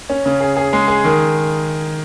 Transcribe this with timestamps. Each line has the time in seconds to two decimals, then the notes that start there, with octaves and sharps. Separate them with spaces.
0.10 C#4
0.26 C#3
0.41 G#4
0.57 G#4
0.73 G#3
0.88 G#4
1.04 D#3